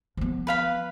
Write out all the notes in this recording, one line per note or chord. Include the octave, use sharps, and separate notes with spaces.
F3 B3
B4 F5 B5